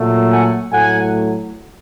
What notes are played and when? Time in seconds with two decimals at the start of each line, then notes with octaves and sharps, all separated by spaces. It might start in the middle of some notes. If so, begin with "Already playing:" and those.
Already playing: A#2 F#3 A3
0.31 F#5 G#5
0.72 A2 F#3 A3 F#5 G#5